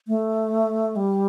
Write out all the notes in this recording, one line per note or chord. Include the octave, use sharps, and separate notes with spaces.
A3
G3